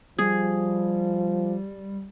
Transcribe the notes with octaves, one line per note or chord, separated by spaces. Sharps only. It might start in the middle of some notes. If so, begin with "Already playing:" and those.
F3 G3 G#4